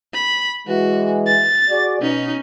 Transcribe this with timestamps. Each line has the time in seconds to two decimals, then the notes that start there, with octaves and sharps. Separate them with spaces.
0.14 B5
0.68 E3 G#3 F#4
1.27 A6
1.69 F#4 G#4 D5
2.01 B2 C#4 D#4